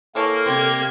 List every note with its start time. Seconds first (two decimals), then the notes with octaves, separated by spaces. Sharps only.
0.15 E3 A#3 A4 A#4 C#5 A5
0.46 C3 G3 G4 C5 G#6